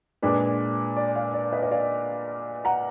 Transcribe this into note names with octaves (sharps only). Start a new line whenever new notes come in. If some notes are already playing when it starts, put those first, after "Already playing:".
A#2 G#3 D4 B4
D5
D5 F5
D5
B4 D#5
D#5
D5 F5
F#5 A#5